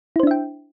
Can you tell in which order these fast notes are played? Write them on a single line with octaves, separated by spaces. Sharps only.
E4 C5 D4 E5 G5